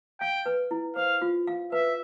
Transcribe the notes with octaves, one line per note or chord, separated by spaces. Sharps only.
F5 G5
B4
E4
C5 F5
F4
F5
B4 E5